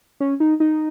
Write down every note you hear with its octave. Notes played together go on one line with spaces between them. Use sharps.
C#4
D#4
D#4